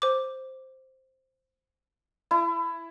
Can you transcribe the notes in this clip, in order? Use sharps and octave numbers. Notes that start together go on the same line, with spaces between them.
C5 D6
E4